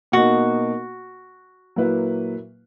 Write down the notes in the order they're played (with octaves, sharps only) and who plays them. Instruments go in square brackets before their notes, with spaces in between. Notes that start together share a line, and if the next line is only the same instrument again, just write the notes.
[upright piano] B2 A#3 D#4 [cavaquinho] F#4
[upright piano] A#2 F#3 A#3 E4 B4